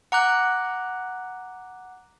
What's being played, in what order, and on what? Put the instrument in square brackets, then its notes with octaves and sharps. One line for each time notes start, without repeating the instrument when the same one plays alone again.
[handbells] F#5 A#5 D6 F#6